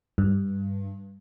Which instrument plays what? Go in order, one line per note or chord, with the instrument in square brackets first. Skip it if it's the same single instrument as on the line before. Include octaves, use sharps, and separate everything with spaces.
[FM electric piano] G2